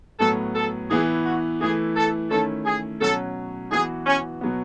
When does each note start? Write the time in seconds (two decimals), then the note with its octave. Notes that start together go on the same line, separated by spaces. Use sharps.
0.20 A2 F#3 B3 A4
0.55 A4
0.90 E3 B3 E4 G#4
1.25 F#4
1.61 E3 A3 E4 G#4
1.96 A4
2.31 D#3 A3 C#4 E4 A4
2.65 G#4
3.01 B2 F#3 C#4 A4
3.71 E3 B3 F#4 G#4
4.06 C#4
4.41 B2 F#3 B3